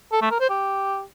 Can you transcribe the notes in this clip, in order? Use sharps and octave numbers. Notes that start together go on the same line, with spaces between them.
A4
A3
A#4
C5
G4